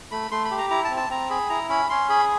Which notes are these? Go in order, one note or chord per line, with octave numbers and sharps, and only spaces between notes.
A3 B5
A3 C6
B5
G4
A#5
E4 A#5
A5
C4
A5
C4 A#5
G#4 B5
E4 A#5
C#4 B5
C#4 C6
G#4 B5